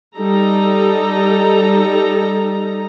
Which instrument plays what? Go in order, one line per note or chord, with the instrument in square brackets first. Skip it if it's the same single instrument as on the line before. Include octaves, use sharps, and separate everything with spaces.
[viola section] G3 D#4 A4 A#5